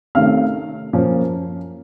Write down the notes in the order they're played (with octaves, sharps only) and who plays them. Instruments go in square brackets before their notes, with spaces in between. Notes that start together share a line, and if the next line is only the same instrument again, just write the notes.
[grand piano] C3 D#3 A3 C#4 F5 F6
F#2 F3 A#3 C#4